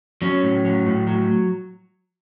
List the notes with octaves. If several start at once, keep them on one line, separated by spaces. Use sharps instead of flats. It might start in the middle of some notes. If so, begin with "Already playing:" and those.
F#3 C#4
A2
F#3
A2
F#3